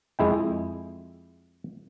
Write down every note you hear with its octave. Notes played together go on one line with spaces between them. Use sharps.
F2 G#3 E4 G5